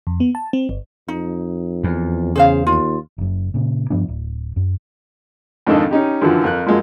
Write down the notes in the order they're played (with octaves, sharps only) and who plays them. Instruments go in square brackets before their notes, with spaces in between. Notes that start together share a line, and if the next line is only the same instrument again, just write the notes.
[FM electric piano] F2
B3
A5
C4
G1
[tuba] F2 [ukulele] D#4
[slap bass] E2
[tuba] C#3 [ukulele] G#4 C5 F5
[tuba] D#2 [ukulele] F4
[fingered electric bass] F#1 F#2
A#2 C#3
G2 F3 B3 D4
D1
F#2
[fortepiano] F2 G#2 D#3 D4 A4 D#5
C#4 D#4 G4
F#2 D3 E3 F3
F2 A#4 F#6
F#2 F3 G#3 A#3